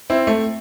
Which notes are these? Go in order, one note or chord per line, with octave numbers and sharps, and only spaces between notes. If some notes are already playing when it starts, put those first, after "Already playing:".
C4 E4
A3